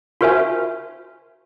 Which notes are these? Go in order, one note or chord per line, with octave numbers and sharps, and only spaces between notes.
F4 F#4 A#4 C5 E5 G#5